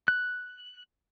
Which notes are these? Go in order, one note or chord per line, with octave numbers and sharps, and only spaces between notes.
F#6